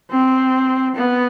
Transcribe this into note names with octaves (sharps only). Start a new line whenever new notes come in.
C4
B3